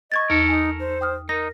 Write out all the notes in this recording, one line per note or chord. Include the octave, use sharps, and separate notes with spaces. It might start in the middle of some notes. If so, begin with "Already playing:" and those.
D#5 C#6 G#6 A6
E2 D#4 A4 A#4
D#4 G#5
C5
G5 D#6 F6
D#4 A#4 A#6